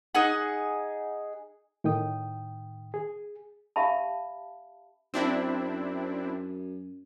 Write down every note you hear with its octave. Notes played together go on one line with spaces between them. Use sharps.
D#4 G#4 F#5
A2 D#3 G5 D#6
G#4
G4 E5 F5 A5 B5
F#2 C4 D4 E4